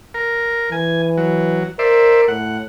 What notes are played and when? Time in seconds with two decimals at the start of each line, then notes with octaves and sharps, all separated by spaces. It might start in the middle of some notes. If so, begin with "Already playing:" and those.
0.14 A#4
0.72 E3 G#5
1.17 F#3
1.79 A#4 C5 D5 E5
2.28 A2 F#5